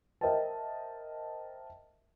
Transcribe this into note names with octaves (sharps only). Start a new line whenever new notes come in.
A#4 C5 D#5 E5 G5 A5